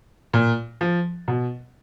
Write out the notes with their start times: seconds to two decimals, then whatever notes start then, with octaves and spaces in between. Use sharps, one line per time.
0.34 A#2
0.81 F3
1.28 B2